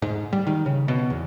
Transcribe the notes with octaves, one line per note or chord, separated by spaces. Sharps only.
G#2
G3
D#3
C#3
B2
E2